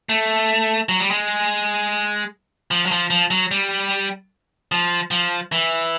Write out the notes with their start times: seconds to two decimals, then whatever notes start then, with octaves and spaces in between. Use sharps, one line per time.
0.09 A3
0.89 F#3
1.00 G3
1.11 G#3
2.71 F3
2.86 F#3
2.91 F3
3.10 F3
3.31 F#3
3.51 G3
4.72 F3
5.11 F3
5.52 E3